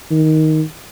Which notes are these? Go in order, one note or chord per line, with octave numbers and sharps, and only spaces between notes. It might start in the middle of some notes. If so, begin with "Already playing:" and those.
D#3